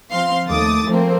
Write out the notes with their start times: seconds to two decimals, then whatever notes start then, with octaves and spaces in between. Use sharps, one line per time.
0.10 F3 C4 F5 C6
0.47 D#2 A3 D6 D#6 A6
0.87 F3 A3 A#3 C4